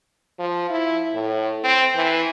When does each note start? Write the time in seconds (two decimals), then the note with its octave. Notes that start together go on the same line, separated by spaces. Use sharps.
0.39 F3
0.70 E4
1.14 A2
1.64 C4
1.96 E3